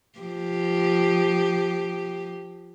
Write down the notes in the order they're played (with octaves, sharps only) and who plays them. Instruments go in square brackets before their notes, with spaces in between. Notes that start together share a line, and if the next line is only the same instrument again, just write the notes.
[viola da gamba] F3 G4